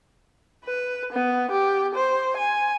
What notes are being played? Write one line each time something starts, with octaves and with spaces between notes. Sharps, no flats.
B4
B3
G4
C5
G#5